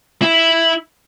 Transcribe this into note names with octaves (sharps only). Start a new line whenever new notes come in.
E4